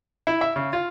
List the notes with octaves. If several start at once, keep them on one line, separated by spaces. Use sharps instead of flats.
E4
E5
C#3
F4